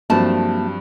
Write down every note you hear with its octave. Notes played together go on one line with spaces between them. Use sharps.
G2 F3 F#3 A3 A#3 C4 F#4 A5